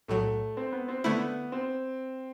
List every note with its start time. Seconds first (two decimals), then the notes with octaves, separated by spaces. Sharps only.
0.08 B1 A2 F#3 A3
0.57 C4
0.72 B3
0.88 C4
1.04 D3 A3 B3 E4
1.52 C4